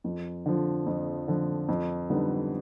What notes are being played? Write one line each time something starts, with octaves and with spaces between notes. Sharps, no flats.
F2
D3 F3
F2
D3 F3
F2
D3 G3 B3 D#4